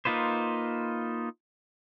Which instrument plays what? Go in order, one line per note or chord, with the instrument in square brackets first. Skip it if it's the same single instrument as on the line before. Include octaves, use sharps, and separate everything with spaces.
[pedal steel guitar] A#3 D#4 F4 B4 C5